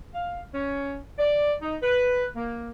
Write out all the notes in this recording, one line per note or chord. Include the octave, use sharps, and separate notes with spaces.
F5
C#4
D5
D#4
B4
A#3